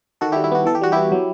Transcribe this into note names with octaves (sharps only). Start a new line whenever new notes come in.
D#3 F#4 A4
G3 E4 G4
E4
B3 F#4
E3 A4
G4
G3 F#4
B3 E4 G4
F#3